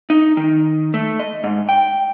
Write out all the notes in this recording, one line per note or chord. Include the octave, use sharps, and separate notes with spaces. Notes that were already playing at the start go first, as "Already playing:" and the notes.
D#4
D#3
A3
D#5
G#2
G5